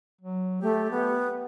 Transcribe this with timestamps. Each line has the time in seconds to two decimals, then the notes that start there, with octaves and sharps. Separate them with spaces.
0.21 F#3
0.62 A3 G4
0.91 B3